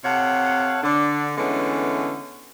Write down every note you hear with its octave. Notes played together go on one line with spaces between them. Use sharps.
C3 A4 C#5 F5 F#5
D3 D4
D3 E3 G#3 A3 B3 C#4